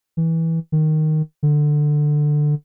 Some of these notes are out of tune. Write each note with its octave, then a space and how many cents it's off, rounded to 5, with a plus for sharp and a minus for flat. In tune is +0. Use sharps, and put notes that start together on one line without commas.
E3 -15
D#3 -5
D3 +15